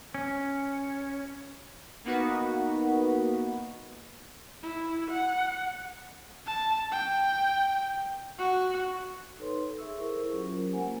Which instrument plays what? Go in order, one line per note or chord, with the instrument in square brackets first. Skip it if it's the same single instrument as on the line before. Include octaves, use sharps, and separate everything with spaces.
[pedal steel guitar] C#4
[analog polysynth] A#3 B3 D#4 F#4 B4
[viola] E4
F#5
[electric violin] A5
G5
F#4
[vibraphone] D#4 A4 B4 C#5 C6
G#4 A4 E5 C#6 E6
E4 G#4 A#4 C5 C#6
F#3 C#4 F4 G4 A#4 C5
G#3 A#3 A#4 C5 F#5 G#5